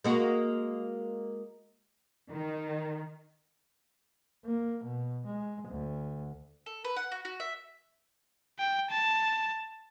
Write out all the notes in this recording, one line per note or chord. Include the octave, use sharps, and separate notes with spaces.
G#3 A#3 F#4
D#3
A#3
B2
G#3
D2
A4
B4
F#5
F#4
F#4
E5
G5
A5